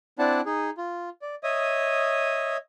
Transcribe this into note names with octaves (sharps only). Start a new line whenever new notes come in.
C4 D4 E4 D5 F#5 A5
D#4 G#4
F4
D5
C#5 D#5 E5 D#6